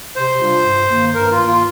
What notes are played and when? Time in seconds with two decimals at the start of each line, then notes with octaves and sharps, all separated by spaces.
0.16 C3 C5
0.40 G3 D4 F4
0.65 G2
0.90 D#3 A#3
1.15 G2 A#4
1.31 F4
1.40 D#3 A#3
1.48 F4